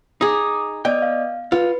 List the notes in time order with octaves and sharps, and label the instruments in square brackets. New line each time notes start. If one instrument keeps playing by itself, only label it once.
[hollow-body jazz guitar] D#4 G#4 [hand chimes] D6 D#6
[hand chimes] B3 D5 D#5 [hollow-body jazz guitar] G5
[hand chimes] F5
[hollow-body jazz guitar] F4 [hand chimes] B4